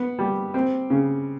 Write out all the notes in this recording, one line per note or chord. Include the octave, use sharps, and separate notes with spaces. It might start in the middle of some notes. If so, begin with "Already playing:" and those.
Already playing: B3
G3
C4
C#3